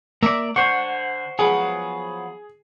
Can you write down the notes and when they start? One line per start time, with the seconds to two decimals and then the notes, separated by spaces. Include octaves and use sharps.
0.23 A#3 D5 E5 A#5
0.56 D3 C5 F#5 C#6
1.39 F3 F#3 B3 G#4